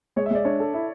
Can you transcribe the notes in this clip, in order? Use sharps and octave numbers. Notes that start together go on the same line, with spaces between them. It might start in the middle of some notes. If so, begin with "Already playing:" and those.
G#3 C#5
E5
G#3 D5
D4 C#5
A4
E4